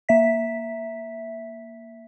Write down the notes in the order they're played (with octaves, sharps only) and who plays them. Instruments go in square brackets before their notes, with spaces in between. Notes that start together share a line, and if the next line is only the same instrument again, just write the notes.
[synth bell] A#3 E5 B6